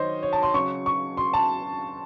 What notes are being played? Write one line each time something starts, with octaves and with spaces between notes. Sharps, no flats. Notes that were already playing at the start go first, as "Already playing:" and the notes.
Already playing: D#3 F#3 C5 C#5 D#5
C#5
A5
C6
C#3 F#3 C#6
C#6
C6
A5